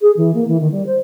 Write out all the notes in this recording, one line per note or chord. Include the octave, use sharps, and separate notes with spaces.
G#4
E3
A#3
E3
D#3
G3
C5